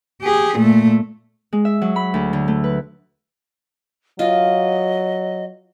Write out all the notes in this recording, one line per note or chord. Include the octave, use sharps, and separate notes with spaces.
G4 G#4
A#2 A3
G#3
E5
F#3
B5
D2
D3
A3
B4
F#3 F4 D#5